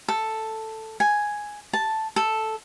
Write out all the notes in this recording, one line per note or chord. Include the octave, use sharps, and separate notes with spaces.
A4
G#5
A5
A4